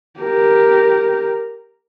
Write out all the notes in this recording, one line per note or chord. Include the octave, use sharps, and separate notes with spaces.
G4 A#4